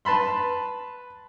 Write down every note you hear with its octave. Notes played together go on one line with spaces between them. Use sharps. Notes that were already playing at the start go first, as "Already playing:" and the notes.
B4 A5 B5 C6